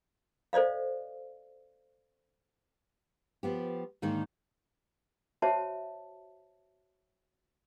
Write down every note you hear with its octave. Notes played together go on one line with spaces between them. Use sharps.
A4 C5 D5 D#5 F5
F3 B3 G4
G#2 D3 D#3 A#3 D#4
F#4 C5 C#5 E5 A5